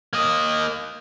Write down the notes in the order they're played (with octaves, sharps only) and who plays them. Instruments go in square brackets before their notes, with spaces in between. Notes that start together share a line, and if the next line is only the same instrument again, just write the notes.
[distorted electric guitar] A#3 D#5